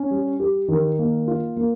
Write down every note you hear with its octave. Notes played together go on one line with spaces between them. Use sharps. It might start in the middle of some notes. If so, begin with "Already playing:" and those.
Already playing: C#4
G3
G4
D#3
A#3
F4
A#3